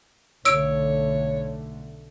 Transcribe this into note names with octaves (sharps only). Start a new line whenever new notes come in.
B1 D3 A3 C#5 E6 D7